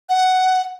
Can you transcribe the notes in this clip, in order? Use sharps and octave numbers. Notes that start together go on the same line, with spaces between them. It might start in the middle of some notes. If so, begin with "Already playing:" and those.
F#5